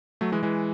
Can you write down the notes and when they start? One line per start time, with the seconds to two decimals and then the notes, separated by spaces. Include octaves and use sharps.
0.21 F#3 A3
0.32 E3 G#3
0.43 E3 G#3